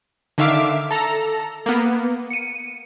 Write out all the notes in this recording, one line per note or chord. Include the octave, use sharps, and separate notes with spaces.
D3 D#3 E5 F5 D6
A4 A#5
A#3 B3
C#7 D#7